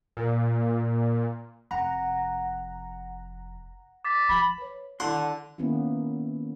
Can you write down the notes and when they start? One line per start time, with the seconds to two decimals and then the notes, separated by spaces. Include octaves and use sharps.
0.17 A#2
1.71 F1 F#5 A#5
4.05 D6 A6 B6
4.29 F3 B5
4.58 B4 C#5
5.00 D3 D#3 E4 F#5 C6
5.58 D#3 A#3 B3 C#4 E4